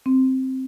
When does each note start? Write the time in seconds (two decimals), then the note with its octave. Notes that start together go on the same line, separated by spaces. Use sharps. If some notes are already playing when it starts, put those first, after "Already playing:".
0.06 C4